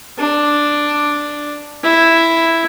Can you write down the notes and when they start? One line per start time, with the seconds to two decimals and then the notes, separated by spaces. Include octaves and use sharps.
0.18 D4
1.83 E4